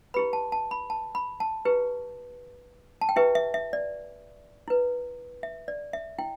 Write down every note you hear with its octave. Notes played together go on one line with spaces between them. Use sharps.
E4 G4 B4 B5
A5
A5
B5
A5
B5
A5
E4 G4 B4
A5
G5
E4 G4 B4 E5
E5
E5
D5
E4 B4
E5
D5
E5
E4 G5